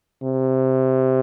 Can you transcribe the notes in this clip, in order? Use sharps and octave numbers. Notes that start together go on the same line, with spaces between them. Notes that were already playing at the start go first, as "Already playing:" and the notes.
C3